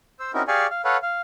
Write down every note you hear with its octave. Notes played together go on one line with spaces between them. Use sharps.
C5 E6
C4 C#4 D#4 E4 F#4 A#4
G4 G#4 D5 F5 G#5 C#6
F5
A4 B4 C#5 F5 F#5
F5